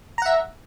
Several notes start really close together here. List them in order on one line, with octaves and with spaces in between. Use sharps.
A#5 F#5 E5